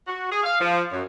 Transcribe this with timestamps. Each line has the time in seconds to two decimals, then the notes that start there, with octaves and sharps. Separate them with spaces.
0.07 F#4
0.31 G#4
0.43 F5
0.60 F3
0.91 F#2